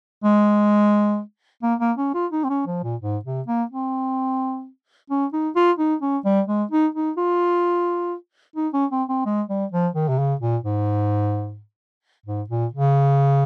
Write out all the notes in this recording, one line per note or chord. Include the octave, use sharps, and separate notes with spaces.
G#3
A#3
A#3
C#4
F4
D#4
C4
C#4
F3
A#2
G#2
C3
A#3
C4
C#4
D#4
F4
D#4
C#4
G3
G#3
D#4
D#4
F4
D#4
C#4
C4
C4
G#3
G3
F3
D#3
C3
C#3
A#2
G#2
G#2
A#2
C#3